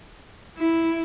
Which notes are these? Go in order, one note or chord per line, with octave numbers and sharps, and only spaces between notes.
E4